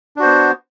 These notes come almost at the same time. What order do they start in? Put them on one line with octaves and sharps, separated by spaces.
D4 F#4 C5 B3